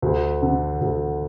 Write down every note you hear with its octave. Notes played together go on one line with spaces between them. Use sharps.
D2
D3
D2